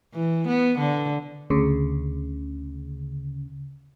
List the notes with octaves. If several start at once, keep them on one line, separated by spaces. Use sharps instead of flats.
E3
B3
D3
D2 C#3